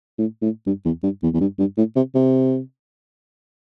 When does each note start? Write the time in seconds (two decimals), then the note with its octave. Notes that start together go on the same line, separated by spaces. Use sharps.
0.18 A2
0.42 A2
0.66 G2
0.85 E2
1.03 G2
1.23 E2
1.34 E2
1.40 G2
1.59 G2
1.78 A2
1.96 C3
2.15 C3